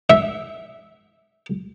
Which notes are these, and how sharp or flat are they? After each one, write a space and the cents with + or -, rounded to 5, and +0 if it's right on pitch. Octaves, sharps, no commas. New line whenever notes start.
E5 -10